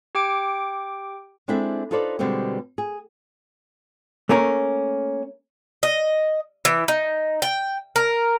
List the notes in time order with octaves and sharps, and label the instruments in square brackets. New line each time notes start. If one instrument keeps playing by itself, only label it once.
[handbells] G4 G5 D6 D7
[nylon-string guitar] G#3 C4 D4 E4 A4 E5
D#4 F4 A4 B4 C5 D5
B2 D3 G3 G#3 B3 C4
G#4
[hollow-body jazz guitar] A3 A#3 C#4 A#4
[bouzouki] D#5
E3
D#4
G5
A#4